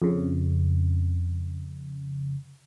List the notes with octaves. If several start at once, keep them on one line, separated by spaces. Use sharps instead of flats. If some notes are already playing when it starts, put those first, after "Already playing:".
F2 C#3